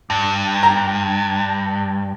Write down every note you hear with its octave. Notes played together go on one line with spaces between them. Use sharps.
G2
A#5